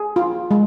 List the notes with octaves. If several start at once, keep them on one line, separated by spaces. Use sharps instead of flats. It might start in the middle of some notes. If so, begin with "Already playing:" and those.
Already playing: G#4
F4
G#3